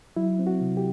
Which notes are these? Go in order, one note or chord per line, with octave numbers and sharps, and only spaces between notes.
F#3 E4
C4
F#4
C3
G4